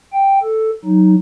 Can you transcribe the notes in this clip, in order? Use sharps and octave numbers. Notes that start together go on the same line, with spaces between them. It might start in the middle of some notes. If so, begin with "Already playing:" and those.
G5
A4
F#3 D#4